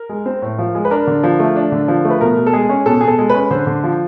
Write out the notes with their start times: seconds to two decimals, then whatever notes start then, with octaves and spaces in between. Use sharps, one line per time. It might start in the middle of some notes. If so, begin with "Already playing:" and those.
Already playing: A#4
0.09 G#3
0.26 C4
0.42 A2
0.59 F3
0.75 G#3
0.85 B4
0.91 D4 A#4
1.07 D3
1.23 F3
1.39 A3
1.56 D4
1.72 D3
1.88 F3
2.05 A3
2.10 B4
2.21 B2 A#4
2.37 B2
2.47 A4
2.53 G#3 G#4
2.69 C#4
2.86 B2 A4
3.01 B2 G#4
3.08 A4
3.19 G#3
3.30 C#4 B4
3.51 D3 C5
3.67 D3
3.84 F3